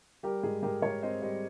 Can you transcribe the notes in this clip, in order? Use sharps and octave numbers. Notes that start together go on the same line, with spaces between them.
G3 G4 A#4
G#2 G#4
G#2 G4 A#4
G#2 A#4 C#5
C4 C5 D#5
G3 C5 D#5